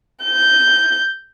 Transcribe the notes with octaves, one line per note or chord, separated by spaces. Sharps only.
G6